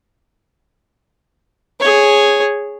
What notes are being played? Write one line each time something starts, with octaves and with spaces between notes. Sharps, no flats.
G#4 C#5